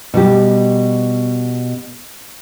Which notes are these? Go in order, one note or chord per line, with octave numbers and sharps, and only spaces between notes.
B2 G3 G4